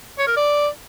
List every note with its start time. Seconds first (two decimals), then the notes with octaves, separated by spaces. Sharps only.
0.18 C#5
0.28 A#4
0.37 D5